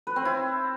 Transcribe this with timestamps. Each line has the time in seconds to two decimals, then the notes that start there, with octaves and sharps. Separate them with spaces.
0.07 B4
0.16 C4
0.25 E4